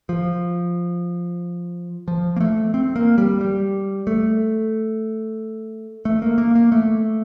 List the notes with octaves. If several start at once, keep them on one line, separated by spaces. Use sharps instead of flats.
F3
F3
A#3
A3
C4
A#3
G3
G3
A3
A3
A#3
A#3
A#3
A3